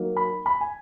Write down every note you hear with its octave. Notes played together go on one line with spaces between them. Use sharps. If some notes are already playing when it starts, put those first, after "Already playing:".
Already playing: F#3 A#3 D#4
B5
B5
G#5